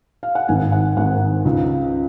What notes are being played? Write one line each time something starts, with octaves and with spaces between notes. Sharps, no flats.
F5
F#5
G#1 G#2 D#3 G#5
F#5
G#1 G#2 D#3 F#5
C#2 C#3